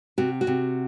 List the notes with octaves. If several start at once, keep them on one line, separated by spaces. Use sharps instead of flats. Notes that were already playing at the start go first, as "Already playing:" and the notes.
C3 F#4
F#4
C3